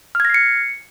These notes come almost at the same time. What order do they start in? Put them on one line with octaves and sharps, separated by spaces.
F6 G#6 A#6 C7 C#7